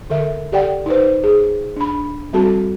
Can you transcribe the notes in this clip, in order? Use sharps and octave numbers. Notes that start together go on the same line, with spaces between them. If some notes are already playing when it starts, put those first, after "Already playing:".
D3 A4 A#4 E5
G4 A4 D5 F#5 G5
D#4 B4 C5
G#4
D4 B5
G3 C4 F#4 A4 A5